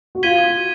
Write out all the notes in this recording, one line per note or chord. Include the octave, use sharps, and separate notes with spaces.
F#4
F4 G#6 B6 D#7 G7